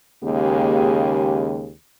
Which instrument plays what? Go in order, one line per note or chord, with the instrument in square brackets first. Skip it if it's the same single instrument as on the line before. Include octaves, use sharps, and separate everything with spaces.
[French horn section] D#2 C#3 G#3 A#3 G4